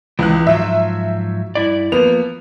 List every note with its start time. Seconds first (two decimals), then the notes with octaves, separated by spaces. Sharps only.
0.19 C#2 E3 F#6
0.47 G#2 F3 F#3 E5
1.55 G2 E4 D5
1.92 F3 A#3 B3 F7